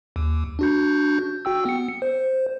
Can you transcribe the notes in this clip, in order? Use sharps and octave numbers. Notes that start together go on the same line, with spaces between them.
D#2
D4 F#4 G6
F#4 G5 E6
B3 C#7
C5